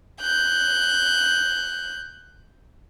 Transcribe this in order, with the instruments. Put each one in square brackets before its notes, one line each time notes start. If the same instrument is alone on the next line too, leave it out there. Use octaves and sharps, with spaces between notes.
[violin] F#6 G6